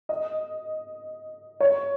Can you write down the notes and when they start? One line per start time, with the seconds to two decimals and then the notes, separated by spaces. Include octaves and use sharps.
0.09 D#5
1.60 C#5